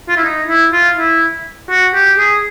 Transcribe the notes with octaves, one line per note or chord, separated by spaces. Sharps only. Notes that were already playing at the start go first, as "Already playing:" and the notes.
F4
E4
D#4
E4
F4
E4
F#4
G4
G#4